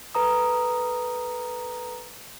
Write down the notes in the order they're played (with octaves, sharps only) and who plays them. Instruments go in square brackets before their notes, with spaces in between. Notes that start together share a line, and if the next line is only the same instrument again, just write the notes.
[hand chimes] A4 B4 A#5 D#6